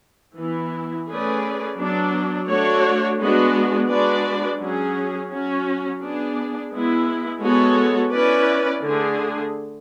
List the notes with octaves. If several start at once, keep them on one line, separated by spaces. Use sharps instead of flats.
E3 B3 E4
A3 C#4 G#4 B4 D5
F#3 B3 D4
A3 D4 F#4 C#5
G#3 B3 D4 F#4
G#3 D4 F#4 B4 D5
F#3 C#4 G#4
F#3 C#4 F#4
B3 D4 G#4
G#3 B3 E4
G#3 B3 F#4 A4 C#5
C#4 E4 B4 D5
D3 A3 D4 G#4